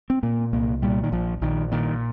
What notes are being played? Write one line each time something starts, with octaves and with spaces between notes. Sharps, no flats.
C4
A#2 A#3
C2 A#3
A#2 G3
D#3
A#1 F3
A#1 D#3
A#2 D#3